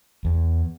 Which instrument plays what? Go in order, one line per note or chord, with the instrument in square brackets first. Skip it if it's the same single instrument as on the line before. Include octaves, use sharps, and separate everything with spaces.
[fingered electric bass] E2